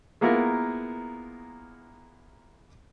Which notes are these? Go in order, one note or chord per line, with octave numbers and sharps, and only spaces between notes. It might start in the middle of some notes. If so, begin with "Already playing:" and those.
G#3 A#3 B3 E4 F4 A#4